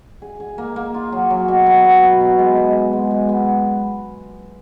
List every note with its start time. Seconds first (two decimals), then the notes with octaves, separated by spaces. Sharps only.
0.22 G#4
0.40 G#4
0.58 A#3
0.76 A#3
0.94 F4
1.12 F#3
1.30 F#3
1.48 B2
1.66 B2
1.84 B3
2.03 B2
2.21 B2
2.39 G#3
2.56 G#3
2.75 F#4
2.93 G#3
3.11 G#3
3.29 B3